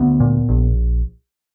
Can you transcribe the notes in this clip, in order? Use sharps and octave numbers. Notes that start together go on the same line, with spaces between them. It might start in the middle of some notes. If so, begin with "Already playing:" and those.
Already playing: D2 B3
A#2
A#1